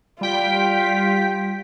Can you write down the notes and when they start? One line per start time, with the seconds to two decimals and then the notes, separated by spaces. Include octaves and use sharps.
0.21 G3 F4 G5 B6